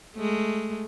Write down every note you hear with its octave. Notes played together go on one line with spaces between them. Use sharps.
G#3 A3